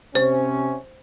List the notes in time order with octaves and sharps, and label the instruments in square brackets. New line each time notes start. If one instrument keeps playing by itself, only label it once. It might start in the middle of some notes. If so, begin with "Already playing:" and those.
[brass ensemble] C3 C#4 [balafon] C5